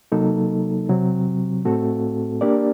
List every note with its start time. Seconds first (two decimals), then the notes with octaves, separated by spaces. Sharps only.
0.12 C3 F#3 A#3 D#4 A4
0.89 C3 F#3 C4
1.65 A2 A3 C4 F#4 A4
2.41 A#3 D4 G4 A#4 D5